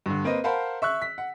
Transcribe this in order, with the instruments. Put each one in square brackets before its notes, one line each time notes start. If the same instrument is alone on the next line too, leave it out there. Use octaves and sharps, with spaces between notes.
[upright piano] G2 D3
A#3 C4 B4 D#5
A#4 C5 F5 F#5 A5 B5
E5 C#6 E6 F#6
B6
F#5